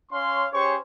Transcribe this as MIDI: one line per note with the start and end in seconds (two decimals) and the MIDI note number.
0.11 0.46 61
0.11 0.46 73
0.11 0.46 77
0.11 0.46 84
0.52 0.75 61
0.52 0.75 67
0.52 0.75 68
0.52 0.75 72
0.52 0.75 73
0.52 0.75 85